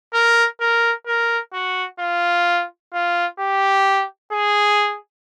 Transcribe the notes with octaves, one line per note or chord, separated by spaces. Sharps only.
A#4
A#4
A#4
F#4
F4
F4
G4
G#4